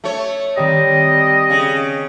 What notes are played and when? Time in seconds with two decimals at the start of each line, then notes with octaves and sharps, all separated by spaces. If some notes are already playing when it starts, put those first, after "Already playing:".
0.04 A3 C#5
0.57 D#3 G3 C4 D#5
1.50 C#3